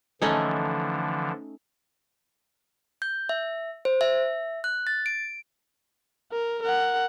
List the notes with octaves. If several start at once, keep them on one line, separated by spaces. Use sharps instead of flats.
D3 E3 F3 A3 C#4 D#4
G6
E5
C5
E5
F#6
A6
D7
A#4
A#4 F#5